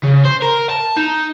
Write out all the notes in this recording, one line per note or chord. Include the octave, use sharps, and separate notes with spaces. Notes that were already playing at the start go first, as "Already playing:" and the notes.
C#3
C5
A#4
A5
D#4